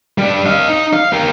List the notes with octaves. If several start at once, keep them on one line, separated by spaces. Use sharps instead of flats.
G3 D4
D#5 F5
D#4
F5
G4 A#4